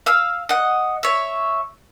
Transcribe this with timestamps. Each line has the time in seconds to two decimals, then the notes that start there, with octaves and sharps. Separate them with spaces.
0.06 F5 E6
0.49 D#5 F#5
1.03 C#5 E5